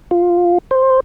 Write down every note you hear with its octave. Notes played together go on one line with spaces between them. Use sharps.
F4
C5